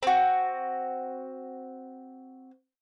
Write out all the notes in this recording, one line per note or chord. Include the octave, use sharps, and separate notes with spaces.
C4 F#4